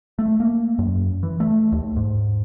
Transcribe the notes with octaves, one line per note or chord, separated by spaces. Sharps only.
A3
A#3
F#2
E3
A3
D#2
G#2